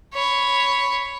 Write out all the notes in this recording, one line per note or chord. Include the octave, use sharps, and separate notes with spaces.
C#5 B5